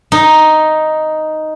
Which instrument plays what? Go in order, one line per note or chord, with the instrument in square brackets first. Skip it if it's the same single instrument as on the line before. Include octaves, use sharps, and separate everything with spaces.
[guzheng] D#4